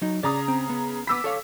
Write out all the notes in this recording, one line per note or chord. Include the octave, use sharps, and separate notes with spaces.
F#3 D#4
C#3 D5 A#5 D#6
C4
B3
B3 B5 D6 E6 B6
A4 C#5 F5